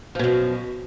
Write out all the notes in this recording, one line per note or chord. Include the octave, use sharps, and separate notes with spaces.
F#2 B2 F3